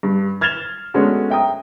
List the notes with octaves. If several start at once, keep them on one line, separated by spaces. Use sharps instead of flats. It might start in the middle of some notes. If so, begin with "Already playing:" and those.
G2
F6 G#6 A6 E7 F7 G7
G#3 A3 B3 C#4 D4 F#4
E5 G5 A#5 D#6